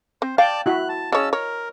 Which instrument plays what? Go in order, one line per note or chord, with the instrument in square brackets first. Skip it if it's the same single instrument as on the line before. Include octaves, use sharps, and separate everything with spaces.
[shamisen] C4 [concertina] C5
[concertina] D5 A5 [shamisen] F5 [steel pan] G5
[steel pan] E4 F#4 E5 [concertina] F#6
[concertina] A5
[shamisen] C#3 C#5 [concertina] C#4 A5 E6 [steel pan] D#5
[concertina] A#4 [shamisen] C#5